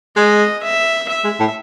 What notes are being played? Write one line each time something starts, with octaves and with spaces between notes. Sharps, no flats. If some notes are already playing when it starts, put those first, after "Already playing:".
G#3 D#5
E5
E5
G#3
A2